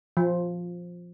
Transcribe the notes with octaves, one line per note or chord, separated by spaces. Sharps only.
F3